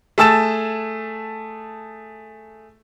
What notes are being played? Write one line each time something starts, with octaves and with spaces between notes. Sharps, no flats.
A3 G#4 A5 E6 A6 E7